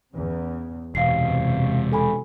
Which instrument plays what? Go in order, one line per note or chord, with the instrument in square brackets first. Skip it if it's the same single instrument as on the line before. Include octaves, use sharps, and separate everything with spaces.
[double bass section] E2 C#3
[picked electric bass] E1 [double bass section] F#2 C3 [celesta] F5 C7
[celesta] A4 G#5 B5